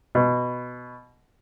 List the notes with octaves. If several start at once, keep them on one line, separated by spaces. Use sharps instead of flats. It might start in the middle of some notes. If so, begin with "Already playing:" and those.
B2